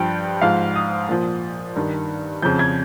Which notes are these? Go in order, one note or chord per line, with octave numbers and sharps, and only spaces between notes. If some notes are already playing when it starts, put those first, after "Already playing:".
Already playing: G2 F3 G5
G#2 F3 F5
D#6
A#2 F3
G2 D#3
F2 C#3 F3 G6
G#6